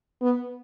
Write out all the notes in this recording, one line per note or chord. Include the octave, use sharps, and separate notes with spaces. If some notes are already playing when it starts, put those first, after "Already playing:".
B3